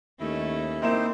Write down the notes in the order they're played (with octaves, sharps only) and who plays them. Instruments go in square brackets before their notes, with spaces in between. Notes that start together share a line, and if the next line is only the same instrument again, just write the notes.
[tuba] D#2 [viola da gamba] A3 C#4 D#4 [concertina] E4
[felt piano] A#3 E4 E7 [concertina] C4 D#4 C5